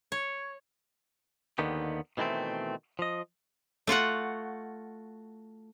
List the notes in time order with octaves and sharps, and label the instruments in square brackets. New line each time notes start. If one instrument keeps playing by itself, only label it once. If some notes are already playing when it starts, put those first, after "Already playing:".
[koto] C#5
[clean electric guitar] D#2 D3 D#3 B3 G4
B2 D#3 E3 A3 C4
F3 D#5
[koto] A3 F4 F#4 F#5